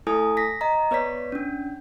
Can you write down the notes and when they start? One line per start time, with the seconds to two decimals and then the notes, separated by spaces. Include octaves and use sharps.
0.07 A3 E4 A4 G#5 D#6
0.37 A#6 B6
0.61 D#5 A#5
0.91 B3 B4 C#5 D5 B6
1.32 C#4 D4